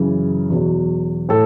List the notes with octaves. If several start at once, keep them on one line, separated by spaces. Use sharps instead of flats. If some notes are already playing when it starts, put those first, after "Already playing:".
Already playing: F#2 C#3 E3
E2 B2 F#3
A2 A4